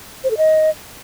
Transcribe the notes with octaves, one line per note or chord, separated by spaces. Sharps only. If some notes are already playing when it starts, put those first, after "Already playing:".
C5
A4
D#5